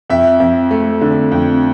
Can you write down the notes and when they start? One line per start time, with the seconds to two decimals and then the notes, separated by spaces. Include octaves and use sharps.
0.10 F2 E5
0.40 F2
0.71 A3
1.01 D3
1.32 F2